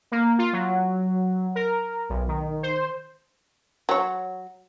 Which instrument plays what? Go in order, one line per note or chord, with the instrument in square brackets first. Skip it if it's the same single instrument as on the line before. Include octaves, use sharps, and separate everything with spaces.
[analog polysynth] A#3
F4
F#3
A#4
B1
D#3
C5
[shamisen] F#3 C#5